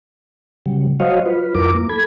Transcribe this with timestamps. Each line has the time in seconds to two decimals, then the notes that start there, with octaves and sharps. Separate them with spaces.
0.66 C#3 F#3 G3
1.00 F#3 F#4 C5 C#5 D#5 F5
1.26 F4 B4
1.55 F2 F#3 E4 F4 A#4 D6
1.75 A#3
1.89 A4 B5 G#6